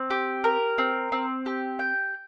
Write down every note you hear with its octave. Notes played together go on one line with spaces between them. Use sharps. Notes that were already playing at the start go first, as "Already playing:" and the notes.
Already playing: C4
G4
A#4
C4
C4
G4
G5